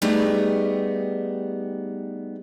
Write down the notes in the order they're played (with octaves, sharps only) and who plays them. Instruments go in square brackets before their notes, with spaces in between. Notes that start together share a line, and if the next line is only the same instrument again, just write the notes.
[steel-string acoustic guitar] G3 A3 B3 D#4 G4 G#4